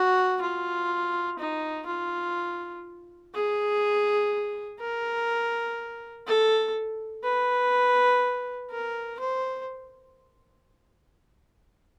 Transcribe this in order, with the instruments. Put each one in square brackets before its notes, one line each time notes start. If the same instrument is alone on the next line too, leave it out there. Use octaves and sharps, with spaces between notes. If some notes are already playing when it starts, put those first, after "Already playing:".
Already playing: [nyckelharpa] F#4
F4
D#4
F4
G#4
A#4
A4
B4
A#4
C5